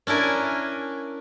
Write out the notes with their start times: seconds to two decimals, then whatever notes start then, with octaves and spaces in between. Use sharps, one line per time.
0.07 C#4 D4 E4 A#4 G#5